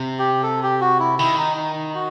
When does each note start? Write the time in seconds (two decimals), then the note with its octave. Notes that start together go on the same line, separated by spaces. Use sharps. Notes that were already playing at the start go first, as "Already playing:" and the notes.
Already playing: C3
0.19 G4
0.43 A4
0.63 G4
0.81 F#4
1.00 E4
1.19 D#3 E4
1.38 D#4
1.57 D#4
1.76 D#4
1.94 F#4